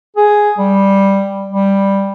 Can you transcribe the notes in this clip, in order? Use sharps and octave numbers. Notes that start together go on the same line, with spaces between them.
G#4
G3
G3